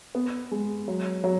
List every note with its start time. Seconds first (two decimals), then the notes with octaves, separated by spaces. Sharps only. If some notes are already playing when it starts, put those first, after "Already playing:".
0.15 B3
0.51 G#3
0.88 F#3
1.24 F#3